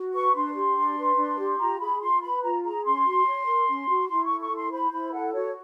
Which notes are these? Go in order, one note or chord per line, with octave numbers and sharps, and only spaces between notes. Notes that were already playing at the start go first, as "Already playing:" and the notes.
Already playing: F#4
B4 C#6
D4 C6
G4
D4
B4
D4
G4
F4 A#5
G#4 B5
F4 C6
B4 B5
F4 A#5
G#4 A#5
C#4 C6
F#4
C#5
A#4
C#4
F#4
E4 C6
A4 C#6
C#6
E4 C6
C5 B5
E4 B5
A4 F#5
F#4 C#5